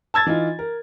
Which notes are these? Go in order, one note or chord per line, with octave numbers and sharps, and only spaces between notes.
A5 E6 G#6 A6
E3 D#4 F4
A#4